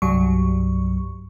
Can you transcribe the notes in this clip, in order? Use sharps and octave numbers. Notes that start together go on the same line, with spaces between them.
C2 G2 F#3 C#6